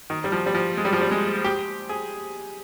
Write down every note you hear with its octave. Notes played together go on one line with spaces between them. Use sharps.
D#3
G3
F3
G3
F3
G#3
G3
F3
G3
G#3
G4
G#4